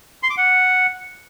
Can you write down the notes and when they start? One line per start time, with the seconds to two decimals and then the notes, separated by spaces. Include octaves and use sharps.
0.23 C6
0.30 D6
0.37 F#5